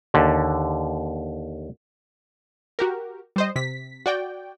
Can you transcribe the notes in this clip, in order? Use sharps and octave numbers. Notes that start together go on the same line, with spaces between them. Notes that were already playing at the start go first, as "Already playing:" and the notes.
D#2 D3
F#4 G4 A#4
G3 C5 D#5
C3 B6
F#4 D5 G5